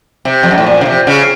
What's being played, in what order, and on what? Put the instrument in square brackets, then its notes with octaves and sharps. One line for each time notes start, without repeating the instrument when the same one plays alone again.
[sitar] C3
F2
F#2
A2
A#2
C#3
C3
C#3